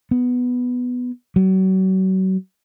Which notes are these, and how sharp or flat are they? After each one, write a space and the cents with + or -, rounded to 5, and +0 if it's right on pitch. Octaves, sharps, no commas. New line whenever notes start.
B3 +5
F#3 +35